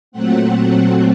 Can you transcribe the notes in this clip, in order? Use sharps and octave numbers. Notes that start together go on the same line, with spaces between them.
A#2 F#3 A3 C4 F#5